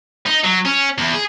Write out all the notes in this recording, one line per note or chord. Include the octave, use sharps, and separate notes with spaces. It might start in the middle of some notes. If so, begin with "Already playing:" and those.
D#4
F#3
C#4
E2
G#4